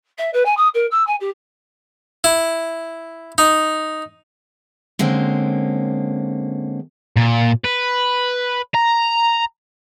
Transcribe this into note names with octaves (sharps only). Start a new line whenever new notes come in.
E5
B4
G#5
D#6
A#4
E6
G#5
G4
E4
D#4
D3 G#3 A#3 C4 C#4
A#2
B4
A#5